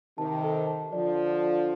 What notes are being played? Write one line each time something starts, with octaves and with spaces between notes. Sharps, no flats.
C3 D#3 A5
A4
A5
D3 F3 D5
D5
D5